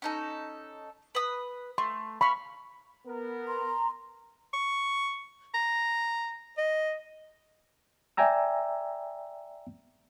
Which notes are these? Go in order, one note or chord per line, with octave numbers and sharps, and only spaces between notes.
C#4 D#4 A4
B4 D#6
A3 C6
F5 B5 C#6 F6
B3 A#4
A#5 C6
C#6
A#5
D#5
D5 E5 G5 G#5 A#5 E6